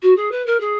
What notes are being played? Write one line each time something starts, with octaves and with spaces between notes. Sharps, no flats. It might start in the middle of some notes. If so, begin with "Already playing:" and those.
F#4
G#4
B4
A#4
G#4